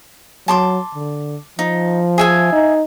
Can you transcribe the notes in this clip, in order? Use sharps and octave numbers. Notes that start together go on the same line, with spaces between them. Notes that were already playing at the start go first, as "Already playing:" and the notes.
F#3 A5 C6 D6
D3
F3 D#4
G#4 E5 G#5
D#4